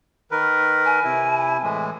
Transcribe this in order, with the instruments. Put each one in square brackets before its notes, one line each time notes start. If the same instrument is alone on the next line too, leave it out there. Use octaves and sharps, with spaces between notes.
[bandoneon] D#3 A#4 B4
[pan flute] G#5
[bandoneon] C3 E4
A2 E3 G#3